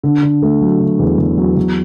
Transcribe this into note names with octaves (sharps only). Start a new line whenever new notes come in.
D3
D3
A3
F#3
D3
E2
E2
F#3
E2